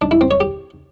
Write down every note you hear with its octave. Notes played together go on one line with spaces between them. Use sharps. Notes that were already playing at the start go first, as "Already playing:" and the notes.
D4
E4
C4
C#5
G4